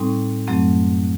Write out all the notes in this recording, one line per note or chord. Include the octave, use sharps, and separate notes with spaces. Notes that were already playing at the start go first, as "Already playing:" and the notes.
Already playing: A2 G3 C4 D#4
F#2 F#3 A3 C4